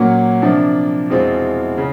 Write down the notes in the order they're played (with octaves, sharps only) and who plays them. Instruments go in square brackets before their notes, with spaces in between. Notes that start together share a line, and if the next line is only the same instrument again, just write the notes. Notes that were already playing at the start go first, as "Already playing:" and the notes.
Already playing: [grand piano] A#2 F#3 A#3 C#4
C3 F3 A#3 D4
E2 B2 G#3 C4 F4
C#3